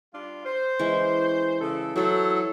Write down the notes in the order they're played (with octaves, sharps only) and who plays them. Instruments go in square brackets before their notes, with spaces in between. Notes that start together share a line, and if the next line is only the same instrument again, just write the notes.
[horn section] G3 D4 F4
C5
[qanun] E3 G#3 C#4
[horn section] C#3 A4
[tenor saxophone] F#3 [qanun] E4 C5 B5 [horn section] A4